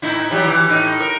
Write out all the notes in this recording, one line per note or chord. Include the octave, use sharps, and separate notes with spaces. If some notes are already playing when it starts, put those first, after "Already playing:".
A2 D#4 E4
E3 F#3 G3
E3
A2 D#4
A#4